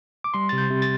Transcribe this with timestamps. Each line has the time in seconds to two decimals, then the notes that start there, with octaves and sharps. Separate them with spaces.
0.24 D6
0.34 G3 C6
0.49 C3 A6
0.58 G6
0.70 C3
0.82 A6